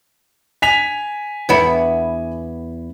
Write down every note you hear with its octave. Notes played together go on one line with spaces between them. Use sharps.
G#5 B6 F7
E2 B3 E4